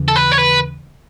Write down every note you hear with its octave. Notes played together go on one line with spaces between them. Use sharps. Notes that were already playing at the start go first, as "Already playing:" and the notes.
Already playing: D#2 C#3 E3
A4
B4
C#5
B4